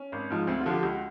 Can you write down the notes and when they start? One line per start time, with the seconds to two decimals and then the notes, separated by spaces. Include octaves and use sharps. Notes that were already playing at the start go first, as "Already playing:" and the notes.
Already playing: C#4
0.12 G#1
0.30 G#2 F3
0.47 D2 C4
0.60 F4
0.66 D3 F3
0.71 G4
0.83 C#2 F#4